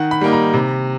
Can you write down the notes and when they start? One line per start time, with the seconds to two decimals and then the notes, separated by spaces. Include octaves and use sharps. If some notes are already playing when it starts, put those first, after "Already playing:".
Already playing: D#3 F#5
0.11 B5
0.21 G3 A#3 D#4
0.33 A#5
0.54 C3